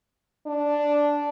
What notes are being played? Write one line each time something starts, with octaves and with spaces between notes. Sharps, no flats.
D4